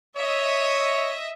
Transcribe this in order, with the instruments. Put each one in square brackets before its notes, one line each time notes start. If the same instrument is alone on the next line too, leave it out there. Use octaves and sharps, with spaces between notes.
[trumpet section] C#5 [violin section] D#5 E5